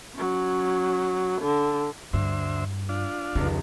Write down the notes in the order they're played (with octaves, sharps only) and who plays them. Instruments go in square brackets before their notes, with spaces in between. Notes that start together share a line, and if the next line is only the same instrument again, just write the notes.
[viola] F#3 C#4
D3
[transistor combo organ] D2 C5 E5 [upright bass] G2
[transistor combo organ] D4 F4
[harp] F1 C#2 [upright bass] D3 D#3